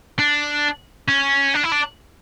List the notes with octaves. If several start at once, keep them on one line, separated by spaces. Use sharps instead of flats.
D4
C#4
D4
E4
D4